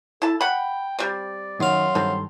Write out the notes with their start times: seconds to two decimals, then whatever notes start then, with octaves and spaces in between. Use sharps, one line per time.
0.22 E4 A4 A5
0.41 F#5 G5 B5
0.99 G3 C4 D5
1.60 F#2 D#3 F5 C6
1.95 G2 D#3 C4 A4